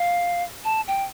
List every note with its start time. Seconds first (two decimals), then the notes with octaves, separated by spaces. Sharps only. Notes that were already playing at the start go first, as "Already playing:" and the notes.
Already playing: F5
0.65 A5
0.87 G5